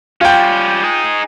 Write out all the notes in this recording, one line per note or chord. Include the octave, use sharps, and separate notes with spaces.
G3 C#4 F4 G5
D#4 G#4